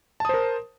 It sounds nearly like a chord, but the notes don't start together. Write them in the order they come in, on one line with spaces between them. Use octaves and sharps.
A5 D#6 C5 A#4